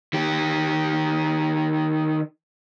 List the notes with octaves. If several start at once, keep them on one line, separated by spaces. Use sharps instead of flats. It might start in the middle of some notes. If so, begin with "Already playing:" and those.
D#3 G4